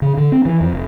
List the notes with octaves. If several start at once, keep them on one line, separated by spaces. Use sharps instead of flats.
C#3
D3
C4
E3
F2
F1